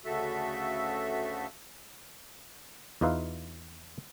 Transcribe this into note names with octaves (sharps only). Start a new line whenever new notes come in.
D2 C#3 A3 F#4 A4 E5
E2 D#4 F4 B4 E5 F5